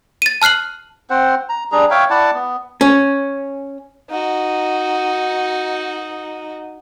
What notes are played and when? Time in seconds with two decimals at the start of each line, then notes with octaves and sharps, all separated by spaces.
0.22 A6 D#7
0.42 A5 F6 F#6 C7 F#7
1.10 C4 C5 F#5
1.49 A#5
1.72 G3 D4 G#4 A#5
1.91 C#5 E5 F5 G5
2.10 E4 D5 F#5 A5
2.34 B3
2.81 C#4
4.10 D#4 F#4